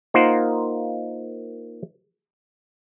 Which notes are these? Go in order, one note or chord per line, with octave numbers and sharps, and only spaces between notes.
A#3 D#4 F4 A#4 C5 F#5